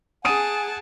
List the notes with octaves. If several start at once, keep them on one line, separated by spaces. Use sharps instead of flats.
G#4 F#5 G#5 A5 D#6 D7 D#7